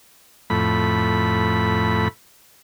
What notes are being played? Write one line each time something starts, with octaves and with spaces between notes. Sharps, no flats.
F2 A2 B5